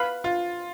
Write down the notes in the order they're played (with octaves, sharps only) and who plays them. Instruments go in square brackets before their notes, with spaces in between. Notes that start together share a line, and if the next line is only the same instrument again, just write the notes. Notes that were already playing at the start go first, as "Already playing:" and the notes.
Already playing: [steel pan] B4 F5 B5
[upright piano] F4